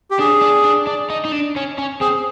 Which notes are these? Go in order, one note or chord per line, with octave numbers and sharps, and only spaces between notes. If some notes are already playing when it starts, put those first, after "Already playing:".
G4
D4 G#4
D4
D4
D4
D#4
D#4
D4
C#4
C#4
C4 G#4